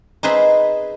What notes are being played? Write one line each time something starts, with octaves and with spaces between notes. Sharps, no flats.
D#4 G#4 B4 C5 D#5 E5